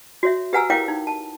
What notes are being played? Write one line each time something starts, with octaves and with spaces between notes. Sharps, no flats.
F#4 C#5 E5
G4 B4 F#5 G#5 A#5 E6
E4 A#4 C#5 F5 G5 D6
D#4
A5